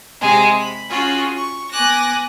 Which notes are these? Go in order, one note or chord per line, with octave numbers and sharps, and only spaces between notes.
C3 G#3 G#4
B5
C#4 F4 F#4 G#4
C#6
B3 G#5 D6 F#6 A#6